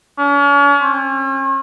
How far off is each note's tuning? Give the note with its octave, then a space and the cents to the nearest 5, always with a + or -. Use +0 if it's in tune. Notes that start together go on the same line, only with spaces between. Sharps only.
C#4 +40
C#4 -40